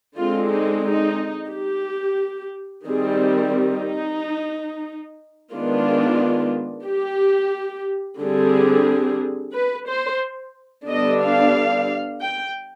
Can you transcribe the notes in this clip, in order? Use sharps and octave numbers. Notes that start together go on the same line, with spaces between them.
D3 G#3 C4 F4
D#4
D#4
G4
D#3 G3 C4 G#4
D#4
D#3 G#3 B3 D4 F4
G4
D3 G3 C4 G#4
B4
C5
D3 G3 B3 D4 D#5
F5
G5